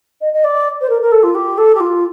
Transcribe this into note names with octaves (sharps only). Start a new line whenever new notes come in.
D#5
D#5
D5
C5
A#4
A#4
A4
F4
G4
A4
G4
F4